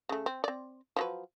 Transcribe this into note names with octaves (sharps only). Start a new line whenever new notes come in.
C#3 A3
C4
C4 D5
F3 F#3 B4